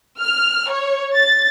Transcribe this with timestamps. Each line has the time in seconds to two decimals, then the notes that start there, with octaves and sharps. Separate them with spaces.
0.21 F6
0.70 C#5
1.15 A6